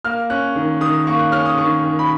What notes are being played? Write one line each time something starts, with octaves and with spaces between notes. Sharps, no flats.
A#3 F6
C#4 F#6
D#3
D#3 D#6
A#3 C#6
F#6
C#4 F6
D#6
D#3 C#6
D#3
B5